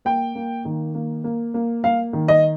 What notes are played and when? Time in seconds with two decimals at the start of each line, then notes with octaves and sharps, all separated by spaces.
0.05 A#3 G5
0.35 A#3
0.65 D#3
0.95 A#3
1.24 A#3
1.54 A#3
1.84 A#3 F5
2.13 D#3
2.28 D#5